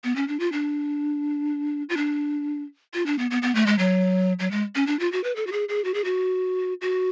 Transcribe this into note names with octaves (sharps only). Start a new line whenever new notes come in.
B3
C#4
D4
F4
D4
F4
D4
F4
D4
B3
B3
B3
A3
G#3
F#3
F#3
G#3
C#4
D4
F4
F#4
B4
A4
F#4
G#4
G#4
F#4
G#4
F#4
F#4